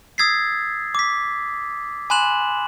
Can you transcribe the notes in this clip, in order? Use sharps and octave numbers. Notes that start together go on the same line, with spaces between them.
D#6 E6 G#6 A6 B6 C7
D6 B6
G#5 B5 C6 F#6 E7 F#7